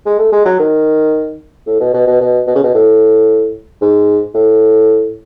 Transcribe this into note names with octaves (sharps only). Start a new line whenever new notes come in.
G#3
A3
G#3
F#3
D#3
A2
B2
B2
B2
B2
B2
C#3
B2
A2
G#2
A2